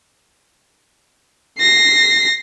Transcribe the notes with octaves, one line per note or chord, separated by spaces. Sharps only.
A#6 C7